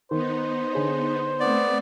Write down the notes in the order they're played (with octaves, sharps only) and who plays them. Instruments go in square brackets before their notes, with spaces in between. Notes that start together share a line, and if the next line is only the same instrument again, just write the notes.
[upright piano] D#3 [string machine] B3 D#4 [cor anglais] C5
[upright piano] D3 G#4 C#5
[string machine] A3 C4 [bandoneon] B3 D5